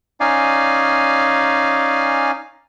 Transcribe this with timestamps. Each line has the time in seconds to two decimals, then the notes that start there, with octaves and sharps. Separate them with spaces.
0.20 C#4 D#4 D5 F5 G#5